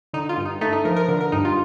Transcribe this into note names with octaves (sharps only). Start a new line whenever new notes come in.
D3 D#4
F4
G2
D#4
A3 D#4
D#4
F3 A#4
A#4
D3 A#4
A#4
G2 D#4
F4